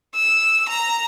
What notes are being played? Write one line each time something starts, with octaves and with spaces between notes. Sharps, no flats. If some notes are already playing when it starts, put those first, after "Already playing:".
E6
A#5